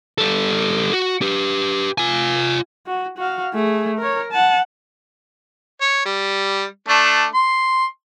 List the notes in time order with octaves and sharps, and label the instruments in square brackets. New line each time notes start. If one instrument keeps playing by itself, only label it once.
[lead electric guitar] G3 A4
F#4
G4 B4
F4 G#5
[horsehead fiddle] F#4
F#4 F5
A3 G#4
A#4 C#5
F#5 A5
[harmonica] C#5
G3
A3 D4
C6